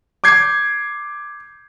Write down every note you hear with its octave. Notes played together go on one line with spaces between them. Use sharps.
D6 G6 G#6 C7